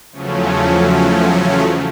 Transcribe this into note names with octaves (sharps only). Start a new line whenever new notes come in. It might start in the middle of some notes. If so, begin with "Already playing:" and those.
E2 C#3 F3 F#3 A3 C#4